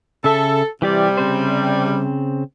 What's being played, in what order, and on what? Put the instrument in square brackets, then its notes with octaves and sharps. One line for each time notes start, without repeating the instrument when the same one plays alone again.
[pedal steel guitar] C#3 E5 [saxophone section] A4
[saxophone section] C3 G3 [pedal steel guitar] E3 G4 D5
[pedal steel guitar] C#3 C4 C5